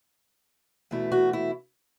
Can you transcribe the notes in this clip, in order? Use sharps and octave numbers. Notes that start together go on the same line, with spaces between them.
E2 B2 A3 E4
F#4
E4